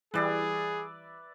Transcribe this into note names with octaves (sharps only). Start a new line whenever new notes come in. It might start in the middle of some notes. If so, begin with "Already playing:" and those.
E3 G3 G#4 B4 D5 E5